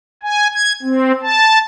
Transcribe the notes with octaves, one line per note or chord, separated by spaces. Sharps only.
G#5
G#6
C4
A5